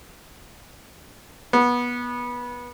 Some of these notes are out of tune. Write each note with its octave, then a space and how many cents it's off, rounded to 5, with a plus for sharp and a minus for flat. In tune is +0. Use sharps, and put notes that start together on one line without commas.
B3 -20